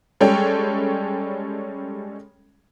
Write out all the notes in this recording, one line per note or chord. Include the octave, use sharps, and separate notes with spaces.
G3 G#3 C#4 A4 C#5 G5